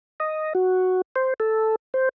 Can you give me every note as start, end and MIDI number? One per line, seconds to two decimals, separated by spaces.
0.20 0.53 75
0.55 1.01 66
1.16 1.34 72
1.40 1.75 69
1.94 2.09 72